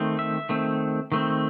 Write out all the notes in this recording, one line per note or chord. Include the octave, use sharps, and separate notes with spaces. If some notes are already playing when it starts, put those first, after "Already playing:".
Already playing: D#3 A3 C4
E5
D#3 A3 C4
D#3 A3 C4